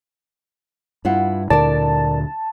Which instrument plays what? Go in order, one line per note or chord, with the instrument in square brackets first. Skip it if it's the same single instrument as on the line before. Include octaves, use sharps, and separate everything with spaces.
[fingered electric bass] G2 [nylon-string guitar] E4 F4 F#5
[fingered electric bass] D2 A#2 D3 [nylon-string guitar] A#4 D5 [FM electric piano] A5